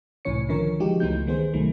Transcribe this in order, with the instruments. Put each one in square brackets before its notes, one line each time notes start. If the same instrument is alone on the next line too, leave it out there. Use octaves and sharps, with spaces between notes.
[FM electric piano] C2 A2 E3 C#4 C#5 C#7
D3 D#3 F3 C#4 A#4 C#5
F3 G#3 D#4 F#4 G4
C#2 E3 A3 B3 D#4 G6
D#3 G3 B3 G#4 C5
C2 D#3 F#3 A3